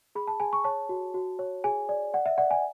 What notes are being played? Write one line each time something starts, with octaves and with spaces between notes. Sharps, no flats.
G#4 B5
A5
G#4 G#5
C#6
C#5 A5
F#4
F#4
C#5
G#4 G#5
D5
D5 F#5
E5
D5 F#5
G#5